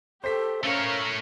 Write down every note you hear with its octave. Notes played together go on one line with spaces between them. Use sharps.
G4 A4 C5 B6
A3 C#4 A#4 C#5 F5